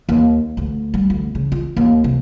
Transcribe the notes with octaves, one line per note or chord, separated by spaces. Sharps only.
D#2
D2
G3
D2
C#3
F4
D#2
C3